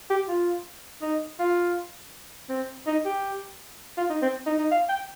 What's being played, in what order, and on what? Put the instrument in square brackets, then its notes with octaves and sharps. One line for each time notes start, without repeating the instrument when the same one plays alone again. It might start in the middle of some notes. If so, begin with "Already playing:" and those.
[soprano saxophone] G4
F4
D#4
F4
C4
D#4
G4
F4
D#4
C4
D#4
D#4
F5
G5